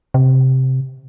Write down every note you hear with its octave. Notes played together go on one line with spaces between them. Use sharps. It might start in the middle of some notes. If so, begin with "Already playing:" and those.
C3